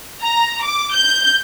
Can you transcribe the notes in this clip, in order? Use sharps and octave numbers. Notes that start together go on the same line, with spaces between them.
A#5
D6
G6